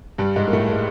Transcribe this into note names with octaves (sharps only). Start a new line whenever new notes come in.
G2 G3
G#2 G#3
A#3
A2 A3
G#3